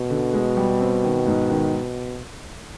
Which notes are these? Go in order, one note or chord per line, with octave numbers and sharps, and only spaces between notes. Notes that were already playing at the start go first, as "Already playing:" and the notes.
Already playing: B2
D3
G#3
G3
C4
D#3
G#2
D#3